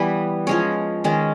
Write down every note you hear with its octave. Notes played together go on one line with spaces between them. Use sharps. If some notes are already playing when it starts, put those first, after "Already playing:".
Already playing: E3 G3 B3 B4
F3 G#3 C#4 C#5
D#3 G#3 C#4